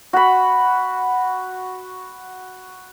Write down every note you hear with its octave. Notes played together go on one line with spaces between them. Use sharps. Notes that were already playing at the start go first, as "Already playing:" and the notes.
F#4 B5